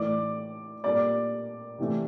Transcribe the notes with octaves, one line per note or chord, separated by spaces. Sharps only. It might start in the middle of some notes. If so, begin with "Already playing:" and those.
Already playing: A2 E3 A3 D5 D6
A#2 G3 A#3 D5 D6
C3 E3 A3